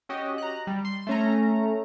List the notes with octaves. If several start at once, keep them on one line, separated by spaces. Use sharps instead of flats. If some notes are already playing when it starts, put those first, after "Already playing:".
C#4 F#4 G4 D#5
A#5 F#6
G3
C6
A3 C#4 A#5